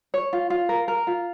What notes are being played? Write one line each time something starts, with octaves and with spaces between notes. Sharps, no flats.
C#5
F4
F4
A#4
A#4
F4